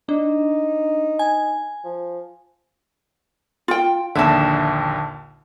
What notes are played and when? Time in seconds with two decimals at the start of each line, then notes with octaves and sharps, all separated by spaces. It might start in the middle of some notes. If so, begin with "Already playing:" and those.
0.09 D4 D#4
1.19 G#5
1.84 F3
3.68 F4 G5
4.15 A#1 D#2 D3 E5 A5